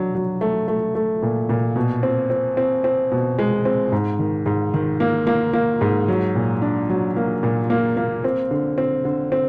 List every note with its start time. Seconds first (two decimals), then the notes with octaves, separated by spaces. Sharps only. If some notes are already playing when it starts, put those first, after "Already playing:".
Already playing: F#3 D4
0.15 F#3
0.41 A3
0.68 A3
0.95 A3
1.22 A#2
1.49 A#2
1.76 B2
2.03 C4
2.30 C4
2.57 C4
2.84 C4
3.12 B2
3.39 G#3
3.65 C4
3.92 G#2
4.19 D#3
4.46 G#2
4.74 D#3
5.00 A#3
5.27 A#3
5.53 A#3
5.81 G#2
6.08 F#3
6.35 A#2
6.62 D4
6.90 F#3
7.16 A#3
7.43 A#2
7.70 A#3
7.97 A#3
8.24 C4
8.51 D3
8.78 C4
9.05 D3
9.32 C4